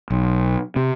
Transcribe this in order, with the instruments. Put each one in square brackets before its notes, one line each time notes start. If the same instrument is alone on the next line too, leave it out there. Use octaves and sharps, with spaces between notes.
[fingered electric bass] B1
C3